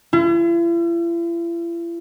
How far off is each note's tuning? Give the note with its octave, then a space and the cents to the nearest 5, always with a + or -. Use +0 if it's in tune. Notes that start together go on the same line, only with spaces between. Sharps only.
E4 +45